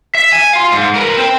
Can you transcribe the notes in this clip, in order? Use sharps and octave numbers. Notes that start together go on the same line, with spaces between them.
E5
G#5
F5 C6
G#2
A#4 B4
C4